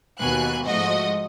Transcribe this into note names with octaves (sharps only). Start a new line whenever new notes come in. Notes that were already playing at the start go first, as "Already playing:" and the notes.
D#2 B2 G#5 F#6
G#2 F3 A3 F#4 D#5